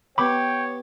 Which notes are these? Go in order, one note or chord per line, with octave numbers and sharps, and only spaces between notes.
B3 G4 C#5 G5 B5 D6